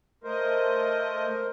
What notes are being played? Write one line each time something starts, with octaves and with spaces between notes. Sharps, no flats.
A3 A#4 C5 D#5